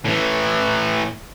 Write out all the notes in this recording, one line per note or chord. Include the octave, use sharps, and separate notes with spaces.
A2 E3